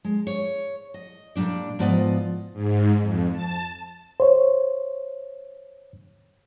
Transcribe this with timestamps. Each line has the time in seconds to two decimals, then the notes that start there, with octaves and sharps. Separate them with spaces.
0.04 G#3
0.27 C#5
0.94 D#5
1.36 A#2 G3 D4 D5
1.79 G#2 F3 B3 F4 D5 D#5
2.53 G#2
3.01 F2
3.32 A5
4.20 C5 C#5